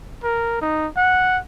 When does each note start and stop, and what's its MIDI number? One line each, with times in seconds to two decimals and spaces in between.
0.23 0.59 70
0.61 0.87 63
0.97 1.38 78